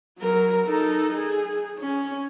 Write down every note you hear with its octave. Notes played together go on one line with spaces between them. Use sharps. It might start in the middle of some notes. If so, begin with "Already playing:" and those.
F#3 A#4
D#4 A4
G#4
C#4